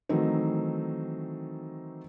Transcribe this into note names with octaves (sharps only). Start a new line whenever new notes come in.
D#3 E3 F#3 A3 C4 D#4